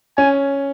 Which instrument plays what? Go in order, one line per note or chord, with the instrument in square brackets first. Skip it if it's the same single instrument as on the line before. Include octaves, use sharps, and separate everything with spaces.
[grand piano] C#4 [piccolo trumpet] G#5